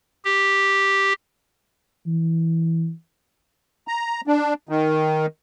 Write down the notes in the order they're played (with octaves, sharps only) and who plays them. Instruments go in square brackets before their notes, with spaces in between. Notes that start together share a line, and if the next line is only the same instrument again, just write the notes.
[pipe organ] G4
[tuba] E3
[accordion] A#5
D4
D#3